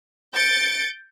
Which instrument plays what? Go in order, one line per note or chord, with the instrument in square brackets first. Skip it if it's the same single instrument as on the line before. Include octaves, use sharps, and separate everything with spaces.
[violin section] G6 A6 C#7 D7